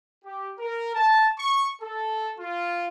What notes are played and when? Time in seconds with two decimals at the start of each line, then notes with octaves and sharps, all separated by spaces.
0.24 G4
0.59 A#4
0.94 A5
1.38 C#6
1.81 A4
2.37 F4